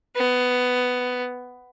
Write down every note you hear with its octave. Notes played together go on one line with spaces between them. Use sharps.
B3